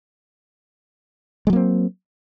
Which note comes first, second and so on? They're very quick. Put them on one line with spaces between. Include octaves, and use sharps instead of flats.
G#3 F#3 A#3 C4